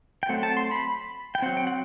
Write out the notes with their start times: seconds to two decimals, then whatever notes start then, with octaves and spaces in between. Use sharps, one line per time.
0.23 G5
0.29 F#3 A3 C4 F#5
0.43 A5
0.57 C6
0.71 B5
1.35 G5
1.42 F#3 C4 F#5
1.57 G5
1.67 F#5